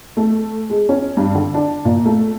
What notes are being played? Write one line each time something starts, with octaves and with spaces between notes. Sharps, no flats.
A3
G#3
C#4
G2
D3
D4
A#2
A3